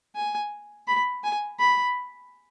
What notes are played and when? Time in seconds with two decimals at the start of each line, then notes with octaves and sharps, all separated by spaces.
0.16 G#5
0.88 B5
1.24 G#5
1.59 B5